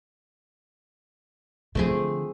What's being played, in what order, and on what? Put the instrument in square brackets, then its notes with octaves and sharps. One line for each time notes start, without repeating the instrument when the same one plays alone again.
[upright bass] D3 F3 [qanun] A3 C4 G#4